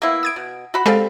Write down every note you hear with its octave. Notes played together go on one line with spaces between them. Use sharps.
A#3 B3 E4
D#6 G#6 D7
B2
F#4 F#5 B5
G3 G#3 C4 G#4 A4 F5